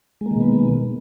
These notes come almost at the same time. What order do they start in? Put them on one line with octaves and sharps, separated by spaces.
G#3 A#3 D#3 B2 B3